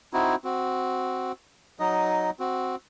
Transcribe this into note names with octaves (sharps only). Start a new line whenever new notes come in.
C4 D#4 E4 F#4
C4 F#4
F#3 D#4 D#5
C4 F#4